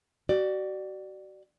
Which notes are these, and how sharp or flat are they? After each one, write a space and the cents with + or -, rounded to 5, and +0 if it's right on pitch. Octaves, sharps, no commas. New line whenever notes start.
F#4 +40 D5 +15